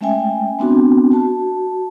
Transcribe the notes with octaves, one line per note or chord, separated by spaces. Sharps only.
G#3 A3 C#4 E5 G5 G#5
B3 C4 D4 F#4
F#4 A5